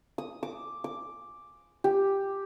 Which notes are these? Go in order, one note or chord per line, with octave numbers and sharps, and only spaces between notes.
D#6
D6
D6
G4